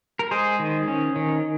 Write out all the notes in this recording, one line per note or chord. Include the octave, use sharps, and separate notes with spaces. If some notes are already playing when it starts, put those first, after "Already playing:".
A#4
G#3 G#4 C5
D#3
C#4
D#3